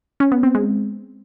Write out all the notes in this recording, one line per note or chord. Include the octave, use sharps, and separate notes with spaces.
C#4
B3
C4
G#3